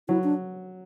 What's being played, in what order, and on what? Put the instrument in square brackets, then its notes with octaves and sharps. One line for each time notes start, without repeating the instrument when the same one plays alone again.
[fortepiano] F#3 [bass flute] E4
[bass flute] D4